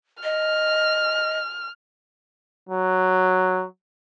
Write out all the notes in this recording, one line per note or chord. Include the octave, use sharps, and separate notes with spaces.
D#5 F6
F#3